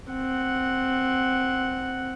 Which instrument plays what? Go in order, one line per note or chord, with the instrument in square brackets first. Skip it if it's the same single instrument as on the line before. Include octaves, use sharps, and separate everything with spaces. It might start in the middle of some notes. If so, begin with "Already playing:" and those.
[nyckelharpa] C4 F#5